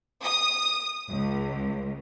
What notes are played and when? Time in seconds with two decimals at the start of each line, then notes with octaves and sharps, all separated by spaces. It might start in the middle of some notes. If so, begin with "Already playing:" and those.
0.24 D#6
1.09 C#2